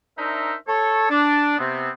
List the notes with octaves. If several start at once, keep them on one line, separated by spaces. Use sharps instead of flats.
D4 D#4 A#4 C5 E5
A4 C#5
D4
C3 B3 C4